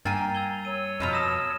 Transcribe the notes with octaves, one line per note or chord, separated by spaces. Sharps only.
G2 A#3 G5 G#5 A#5 E6 A6 C7
E6 G#6 G7
C#5 E6 D#7
F2 B2 F3 A#5 B5 F6 D#7
D#6 A#6 E7